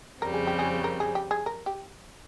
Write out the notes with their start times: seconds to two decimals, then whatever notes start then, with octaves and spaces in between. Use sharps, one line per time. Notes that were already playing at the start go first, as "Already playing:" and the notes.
0.22 F2 C#3 G3 C4 A#4
0.34 G#4
0.47 G4
0.59 G#4
0.84 A#4
1.00 G#4
1.15 G4
1.31 G#4
1.46 A#4
1.66 G4